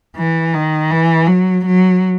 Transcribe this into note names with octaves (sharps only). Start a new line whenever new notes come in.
E3
D#3
E3
F#3
F#3